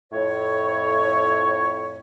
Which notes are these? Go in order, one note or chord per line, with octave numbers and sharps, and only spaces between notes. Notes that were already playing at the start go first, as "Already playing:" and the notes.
F2 A2 C#5